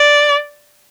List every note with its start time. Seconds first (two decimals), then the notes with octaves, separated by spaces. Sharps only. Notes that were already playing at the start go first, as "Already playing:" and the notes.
Already playing: D5